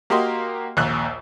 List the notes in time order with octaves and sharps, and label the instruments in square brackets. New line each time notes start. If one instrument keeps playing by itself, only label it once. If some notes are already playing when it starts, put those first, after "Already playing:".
[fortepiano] A#3 F#4 G4 D#5 C6
A#1 D#2 F#6